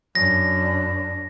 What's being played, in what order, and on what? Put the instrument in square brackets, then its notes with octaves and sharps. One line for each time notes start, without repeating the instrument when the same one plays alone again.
[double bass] F#2 D4 [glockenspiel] A#6